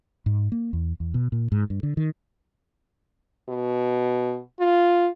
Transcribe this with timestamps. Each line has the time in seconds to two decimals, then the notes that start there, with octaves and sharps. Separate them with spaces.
0.26 G#2
0.52 A#3
0.73 E2
1.00 E2
1.14 B2
1.32 A#2
1.52 G#2
1.70 G2
1.83 D3
1.97 D#3
3.49 B2
4.59 F4